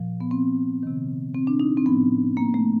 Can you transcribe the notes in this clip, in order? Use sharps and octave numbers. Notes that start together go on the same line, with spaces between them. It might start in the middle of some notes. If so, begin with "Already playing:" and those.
Already playing: A#2 F3
B3
C4
C3 D#3
C4
D4
D#4
C4
A2 F3 B3
A#3
A3